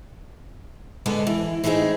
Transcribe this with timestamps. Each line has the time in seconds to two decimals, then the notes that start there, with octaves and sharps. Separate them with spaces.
1.06 B2 D3 G#3 B3 A4 B4
1.27 E3
1.64 E3 A3 C4 D#4 G#4